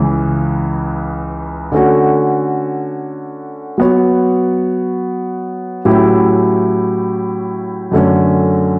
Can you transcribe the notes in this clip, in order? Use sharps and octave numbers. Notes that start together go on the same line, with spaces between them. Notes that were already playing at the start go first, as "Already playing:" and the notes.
Already playing: C#2 C#3 E3
D3 A3 C#4 F#4
F#3 B3 F#4 C#5
A2 F#3 C#4 E4 G4
F#2 D3 A3 C#4